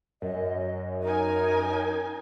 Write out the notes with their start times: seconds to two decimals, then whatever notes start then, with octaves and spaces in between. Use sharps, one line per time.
0.22 F#2 D#5
1.03 D#4 A#4 G#5